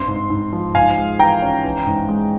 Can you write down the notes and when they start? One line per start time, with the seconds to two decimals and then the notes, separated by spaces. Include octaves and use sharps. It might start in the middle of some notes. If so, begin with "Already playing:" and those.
Already playing: G2 C4 C6
0.08 G#2
0.30 G#2
0.53 F3
0.75 G#2 F5 G#5
0.98 G#3
1.19 E3 G5 A#5
1.42 C#4
1.64 E3
1.87 G#2
2.09 G#3